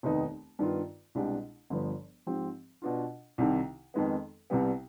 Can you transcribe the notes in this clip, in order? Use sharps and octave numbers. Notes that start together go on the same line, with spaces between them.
F1 D#2 D#3 B3 D#4
G2 D#3 B3 F4
C2 B2 G#3 D4 G4
G1 G2 F3 B3
G#2 F3 C4 G4
B2 B3 D4 F4
C2 C3 D#3
F2 D#3 G#3 B3
C2 C3 G3 B3